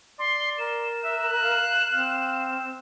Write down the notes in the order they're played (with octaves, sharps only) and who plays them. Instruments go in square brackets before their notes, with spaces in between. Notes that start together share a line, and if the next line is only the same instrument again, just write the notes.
[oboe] D5 [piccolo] C6
[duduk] A#4 [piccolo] E7
[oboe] E5 [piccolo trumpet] F#6
[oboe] F5
[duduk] C4 [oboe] F5